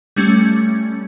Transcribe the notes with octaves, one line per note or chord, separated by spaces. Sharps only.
G3 A3 C#4